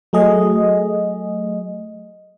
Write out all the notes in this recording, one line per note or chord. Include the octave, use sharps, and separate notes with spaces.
F#3 A3 G#4 D#5